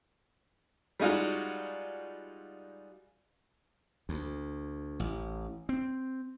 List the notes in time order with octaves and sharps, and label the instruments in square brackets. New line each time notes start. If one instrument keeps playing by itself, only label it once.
[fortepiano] G3 G#3 D#4 F4 F#4
[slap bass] D2
A1
C4